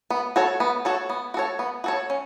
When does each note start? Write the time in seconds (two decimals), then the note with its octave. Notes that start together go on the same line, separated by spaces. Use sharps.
0.10 B3
0.36 F#4 A4 C#5
0.60 B3
0.85 F#4 A4 C#5
1.10 B3
1.34 F#4 A4 C#5
1.59 B3
1.84 F#4 A4 C#5
2.10 C#4